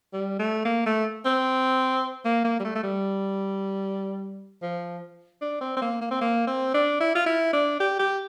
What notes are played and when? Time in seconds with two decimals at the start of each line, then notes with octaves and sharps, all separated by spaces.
0.13 G3
0.39 A3
0.65 A#3
0.86 A3
1.25 C4
2.25 A#3
2.45 A#3
2.60 G3
2.65 A3
2.75 A3
2.83 G3
4.62 F3
5.42 D4
5.61 C4
5.77 C4
5.82 A#3
6.01 A#3
6.11 C4
6.21 A#3
6.47 C4
6.74 D4
7.00 E4
7.15 F4
7.26 E4
7.53 D4
7.80 G4
7.99 G4